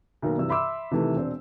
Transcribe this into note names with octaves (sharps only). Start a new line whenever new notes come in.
B1 D#3 A#3
G2 C3 E3 E6
E5 B5 C6 D6 E6
C3 D#3 E3 A3
E1 C4 D4